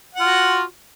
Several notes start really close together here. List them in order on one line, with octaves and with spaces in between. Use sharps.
F#5 F4 F#4